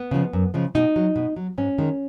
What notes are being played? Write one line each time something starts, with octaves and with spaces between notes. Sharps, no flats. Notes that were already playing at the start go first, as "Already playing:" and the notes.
Already playing: B3
C#3 F3 G#3
F#2
C#3 F3 G#3
B2 D#4
F#3
B2
F#3
G#2 C#4
D#3 G#3